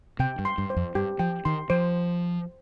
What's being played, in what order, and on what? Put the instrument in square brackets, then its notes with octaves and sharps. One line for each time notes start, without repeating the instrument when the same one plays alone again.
[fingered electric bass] C3 [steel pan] G5
[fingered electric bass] G2
[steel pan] C6
[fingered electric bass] G2
[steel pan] C5
[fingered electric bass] F2
[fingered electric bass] G2 [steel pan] G4
[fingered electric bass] F3 [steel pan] G5
[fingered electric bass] D#3 [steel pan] C6
[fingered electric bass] F3 [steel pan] C5